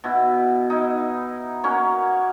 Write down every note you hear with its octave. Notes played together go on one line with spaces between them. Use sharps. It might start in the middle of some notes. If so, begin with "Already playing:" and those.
B2 E4
D#4 E4
A#3 C#4 F#4